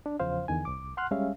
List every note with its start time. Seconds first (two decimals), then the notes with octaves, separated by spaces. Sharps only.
0.06 D4
0.20 E2 C#3 F3 C5 F5
0.48 E2 D3 D#3 G#5
0.65 C2 D6
0.97 F#5 C6 F6 F#6
1.11 G3 G#3 C#4 E5 F5